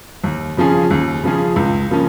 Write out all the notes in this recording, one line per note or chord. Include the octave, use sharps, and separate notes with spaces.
D#2
C#3 F3 C#4 G#4
D#2
C#3 F3 C#4 G#4
C#2
C#3 F3 A#3 C#4